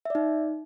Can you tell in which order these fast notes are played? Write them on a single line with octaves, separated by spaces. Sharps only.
E5 D5 D#4